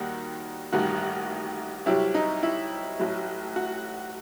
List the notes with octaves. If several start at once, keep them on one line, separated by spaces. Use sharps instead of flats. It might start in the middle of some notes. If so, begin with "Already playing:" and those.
Already playing: D#2 D#3 G3 F#4
A1 G2 D#3 F#4
C2 C3 F#3 E4
D#4
E4
A1 A2 F#3
F#4